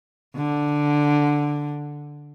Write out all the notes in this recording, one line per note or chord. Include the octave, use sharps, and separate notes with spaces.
D3